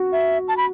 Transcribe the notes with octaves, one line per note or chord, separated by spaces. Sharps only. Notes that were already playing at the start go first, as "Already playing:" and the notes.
Already playing: F#4
E5
A5
B5